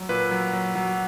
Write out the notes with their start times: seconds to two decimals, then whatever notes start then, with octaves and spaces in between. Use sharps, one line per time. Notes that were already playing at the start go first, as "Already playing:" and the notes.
Already playing: F#3
0.09 A#2 B4
0.31 F#3
0.53 F#3
0.75 F#3